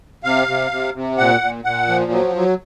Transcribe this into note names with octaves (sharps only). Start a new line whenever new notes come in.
C3 F5
C3
C3
C3
A#2 F#5
A#2
A#2 F#5
F3
F#3
F#3